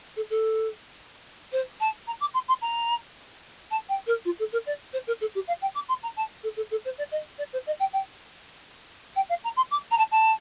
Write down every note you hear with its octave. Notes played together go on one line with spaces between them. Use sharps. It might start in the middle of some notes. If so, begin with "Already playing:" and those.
A4
A4
C5
A5
A#5
D6
C6
C6
A#5
A5
G5
A#4
F4
A4
A#4
D5
C5
A#4
A4
G4
F5
G5
D6
C6
A#5
A5
A4
A4
A4
C5
D5
D#5
D5
C5
D#5
G5
G5
G5
F5
A#5
C6
D6
A#5
A5
A5